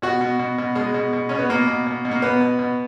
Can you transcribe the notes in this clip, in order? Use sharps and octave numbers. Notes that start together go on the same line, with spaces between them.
B2 F#4
B2
B2
B2
B2 G#3
B2
B2
B2 C#4
B3
B2 A#3
B2
B2
B2
A#3
B2 B3
B2
B2